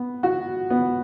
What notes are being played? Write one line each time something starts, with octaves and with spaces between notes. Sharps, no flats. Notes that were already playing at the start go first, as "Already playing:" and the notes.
Already playing: B3
F#4
B3